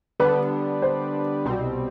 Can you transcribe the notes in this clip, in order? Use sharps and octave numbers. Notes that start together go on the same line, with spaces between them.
D3 G3 B3 D4 B4
C5
C2 B2 G3 C4